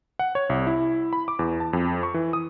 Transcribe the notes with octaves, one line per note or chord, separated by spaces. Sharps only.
F#5
C#5
C2
E4
B5
D6
E2
A5
F2
C#6
E3
D#6